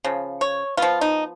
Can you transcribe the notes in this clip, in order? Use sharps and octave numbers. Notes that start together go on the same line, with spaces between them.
C#3 F3
C#5
F3 B3 F4
D#4